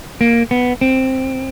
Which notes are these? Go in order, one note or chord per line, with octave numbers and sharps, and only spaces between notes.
A#3
B3
C4